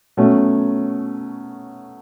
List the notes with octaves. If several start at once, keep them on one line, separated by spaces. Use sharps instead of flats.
B2 F#3 A3 C#4